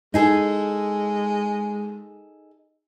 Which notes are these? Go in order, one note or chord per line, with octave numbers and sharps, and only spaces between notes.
G#3 D#4 G#4 A4